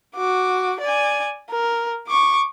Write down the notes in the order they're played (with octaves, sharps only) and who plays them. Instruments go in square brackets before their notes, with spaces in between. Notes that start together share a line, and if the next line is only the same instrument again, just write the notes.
[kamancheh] F#4 D6
D5 G#5
A#4
C#6 D6